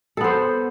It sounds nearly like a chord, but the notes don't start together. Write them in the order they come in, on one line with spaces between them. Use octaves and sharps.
A4 B3 C5